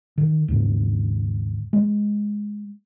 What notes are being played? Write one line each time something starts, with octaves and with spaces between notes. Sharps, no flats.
D#3
D#2 G#2 C#3
G#3